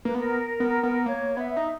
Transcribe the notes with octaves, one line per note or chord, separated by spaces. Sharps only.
A#3 B4
B3 A#4
B3
B3
A#3 C#5
B3 E5
D#4